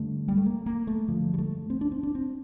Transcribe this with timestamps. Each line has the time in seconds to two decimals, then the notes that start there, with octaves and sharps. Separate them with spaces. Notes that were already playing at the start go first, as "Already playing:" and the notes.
Already playing: G2 D3 A3
0.28 G3
0.37 A3
0.46 A#3
0.66 A#3
0.87 A3
1.08 G2 D3 F3
1.34 G3
1.38 A3
1.70 C4
1.81 D4
1.92 C4
2.03 D4
2.15 C4